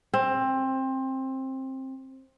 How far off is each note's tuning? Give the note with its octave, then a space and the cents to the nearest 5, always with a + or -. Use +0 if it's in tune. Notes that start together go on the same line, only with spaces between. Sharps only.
C4 +20